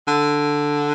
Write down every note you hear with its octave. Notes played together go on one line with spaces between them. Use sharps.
D3